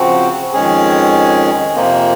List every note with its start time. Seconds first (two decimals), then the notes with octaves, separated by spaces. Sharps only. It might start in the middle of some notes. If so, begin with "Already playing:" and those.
Already playing: C#3 F3 C4 F#4
0.53 F2 D#3 G#3 C#4 G#4
1.74 F2 C3 F3 A#3